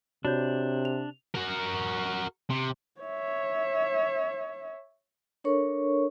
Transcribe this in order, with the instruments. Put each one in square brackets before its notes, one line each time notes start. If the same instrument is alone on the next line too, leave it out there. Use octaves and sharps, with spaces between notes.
[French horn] C3 [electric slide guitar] D4 [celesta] F#4 C#5 G6
[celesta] F7
[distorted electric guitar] F#4 A#4
C3
[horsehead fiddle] C#5 E5
[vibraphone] D4 A4 A#4 C#5 C#6